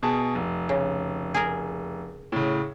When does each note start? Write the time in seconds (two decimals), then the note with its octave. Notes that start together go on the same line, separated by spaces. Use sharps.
0.03 B2 G#4 A5
0.35 F1
0.69 C#3
1.34 G#4 A#4
2.32 A2 C#3